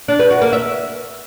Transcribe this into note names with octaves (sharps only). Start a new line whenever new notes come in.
D4
B4
F#4
A#3
E5